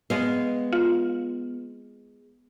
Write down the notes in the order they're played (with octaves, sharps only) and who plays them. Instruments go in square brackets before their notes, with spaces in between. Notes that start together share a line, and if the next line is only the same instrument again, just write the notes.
[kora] G#3 F5 [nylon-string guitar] B3
[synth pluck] F4